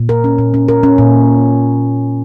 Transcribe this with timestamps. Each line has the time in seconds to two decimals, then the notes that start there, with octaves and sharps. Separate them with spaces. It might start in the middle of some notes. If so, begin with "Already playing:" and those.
Already playing: A#2
0.09 A#4
0.24 C#4
0.39 A#2
0.54 C#4
0.68 A#4
0.83 C#4
0.98 A#2